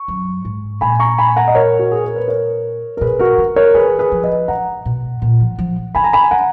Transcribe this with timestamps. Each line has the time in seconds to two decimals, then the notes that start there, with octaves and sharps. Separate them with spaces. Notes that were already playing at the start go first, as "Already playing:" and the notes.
Already playing: C#6
0.08 F#2
0.45 G#2
0.81 A#2 G#5 B5
1.00 A#5 C#6
1.18 G#5 B5
1.36 F#5 A#5
1.48 D#5
1.55 A#4 C#5
1.79 F#4
1.92 G#4
2.04 A#4
2.16 B4
2.28 A#4 C#5
2.97 A#4
3.01 B2 G#4 B4
3.19 F#4 A#4
3.38 C#3
3.56 A#4 C#5
3.74 D#3 G#4 B4
3.99 G#4 B4
4.12 F3
4.24 B4 D#5
4.48 C#3 F#5 A#5
4.85 B2
5.22 A#2
5.40 F3
5.59 F3
5.95 C#3 G#5 B5
6.04 A#5
6.13 G#5 B5
6.31 D#3 F#5 A#5